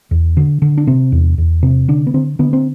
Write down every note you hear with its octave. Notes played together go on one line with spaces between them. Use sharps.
E2
D3
D3
D4
C3 C4
E2
E2
C3
D3 D4
B3
D3 C4
D3 B3
C4